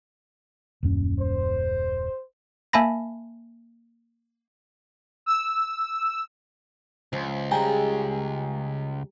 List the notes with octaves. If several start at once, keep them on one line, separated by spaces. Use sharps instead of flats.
D#1 F#2 C#4
C5
A#3 E5 G#5 A5 B5 A#6
E6
C#2 F3
G3 G#3 G5 G#5 A#5